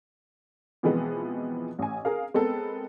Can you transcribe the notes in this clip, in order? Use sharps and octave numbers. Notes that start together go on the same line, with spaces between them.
B2 E3 F3 G#3 B3 C4
A1 G#5
G#4 A#4 F5
G#3 B3 C4 A4 A#4